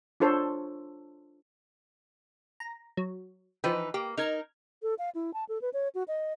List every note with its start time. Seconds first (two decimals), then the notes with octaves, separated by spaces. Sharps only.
0.20 D4 F4 A4 C5 C#5
2.60 A#5
2.97 F#3
3.64 E3 F3 D#4 B4 G5
3.94 A#3 G4
4.17 D#4 A#4 F6 G#6
4.83 A4
4.99 F5
5.15 E4
5.34 A5
5.49 A4
5.62 B4
5.73 C#5
5.95 F#4
6.08 D#5